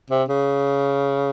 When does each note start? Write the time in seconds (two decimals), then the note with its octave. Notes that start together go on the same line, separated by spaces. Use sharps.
0.10 C3
0.29 C#3